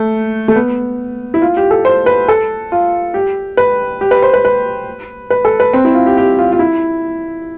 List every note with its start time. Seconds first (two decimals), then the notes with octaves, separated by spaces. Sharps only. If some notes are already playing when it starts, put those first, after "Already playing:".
Already playing: A3
0.48 A3
0.56 B3
1.34 E4
1.42 F4
1.57 G4
1.71 A4
1.85 C5
2.06 B4
2.28 A4
2.72 F4
3.14 G4
3.57 B4
4.01 G4
4.11 B4
4.22 C5
4.33 B4
4.45 B4
5.30 B4
5.45 A4
5.60 B4
5.73 C4
5.85 E4
5.95 F4
6.06 G4
6.17 G4
6.39 F4
6.52 F4
6.59 E4